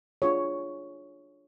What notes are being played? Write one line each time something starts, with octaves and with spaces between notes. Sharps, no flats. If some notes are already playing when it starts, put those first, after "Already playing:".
D4 F4 G#4 C#5